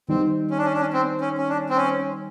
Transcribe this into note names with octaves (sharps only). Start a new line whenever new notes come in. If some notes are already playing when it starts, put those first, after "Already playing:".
D#3 G3 B3 C4 D#4
C#4
D4
C#4
D4
C#4
C4
C#4
C#4
D4
C4
C#4